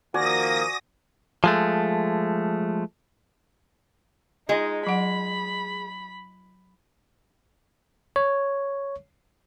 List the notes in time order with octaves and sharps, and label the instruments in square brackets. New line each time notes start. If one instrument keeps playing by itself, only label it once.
[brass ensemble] D#3 F3 A#3 [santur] F#4 D5 G#5 [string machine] D#6 A#6
[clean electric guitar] F3 G#3 A3
[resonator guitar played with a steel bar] G#3 [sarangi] D#4 [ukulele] F4 D#5
[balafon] F#3 F#5 [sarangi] B5
[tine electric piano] C#5